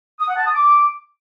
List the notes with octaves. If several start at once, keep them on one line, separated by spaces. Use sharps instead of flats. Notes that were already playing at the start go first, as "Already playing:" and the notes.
D#6
F#5
A5
D#6
D6